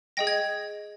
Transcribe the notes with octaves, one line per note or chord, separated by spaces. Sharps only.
G#4 D#5 G5 A#6
G#6